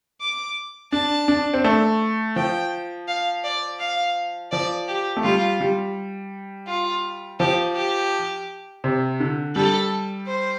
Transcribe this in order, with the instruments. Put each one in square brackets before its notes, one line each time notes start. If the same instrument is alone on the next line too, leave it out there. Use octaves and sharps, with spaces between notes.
[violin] D6
[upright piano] D4 [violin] A5
[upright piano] D4
C4
A3
[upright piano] F3 [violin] G5
[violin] F5
D5
F5
[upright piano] F3 [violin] D5
[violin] G4
[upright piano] A3
[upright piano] G3 [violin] F4
[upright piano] G3
[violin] F4
[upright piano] F3 [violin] G4
[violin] G4
[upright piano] C3
D3
[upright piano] G3 [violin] A4
[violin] C5